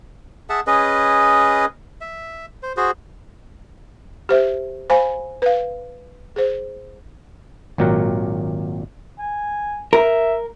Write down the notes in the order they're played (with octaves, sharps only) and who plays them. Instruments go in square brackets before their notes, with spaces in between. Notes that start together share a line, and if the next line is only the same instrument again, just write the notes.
[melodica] G#4 E5 F#5 A5
C#4 G#4 B4 D#5
E5
C5
F#4 G#4 C5
[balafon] G4 C5 E5
C5 F5 G#5 B5
B4 F5
G#4 C5
[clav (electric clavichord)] G#1 A#2 F#3 G4 A#4 F#5
[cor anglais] G#5
[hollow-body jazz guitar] A#4 [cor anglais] E5